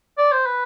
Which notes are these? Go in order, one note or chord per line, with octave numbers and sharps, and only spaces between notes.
D5
C5
B4